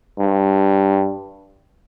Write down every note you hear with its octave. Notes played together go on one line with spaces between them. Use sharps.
G2